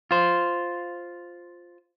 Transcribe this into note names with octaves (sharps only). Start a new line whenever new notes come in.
F4 C5